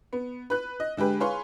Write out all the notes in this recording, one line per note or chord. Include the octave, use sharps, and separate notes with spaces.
B3
B4 F#6
D#5
D3 G#3 G4 B4
G#4 B4 C#5 F5 C6